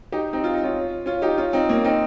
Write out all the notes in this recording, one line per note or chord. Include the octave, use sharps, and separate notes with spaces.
D#4 G4
C4 D#4
F4
D#4
C#4 F4
C#4 F4
D#4 G4
C#4 F4
C4 D#4
A#3 C#4
C4 D#4